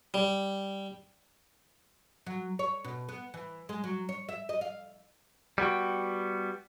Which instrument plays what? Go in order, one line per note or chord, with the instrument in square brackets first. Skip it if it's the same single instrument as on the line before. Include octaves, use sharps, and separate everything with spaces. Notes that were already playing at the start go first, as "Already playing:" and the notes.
[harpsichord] G3
[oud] F#3
C#5
B2
B3
E3
G#3
F#3
C#5
E5
D#5
F5
[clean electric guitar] G3 B3 F#4 G5